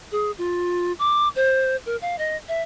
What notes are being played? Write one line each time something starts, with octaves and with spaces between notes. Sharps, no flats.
G#4
F4
D6
C5
A#4
F5
D#5
E5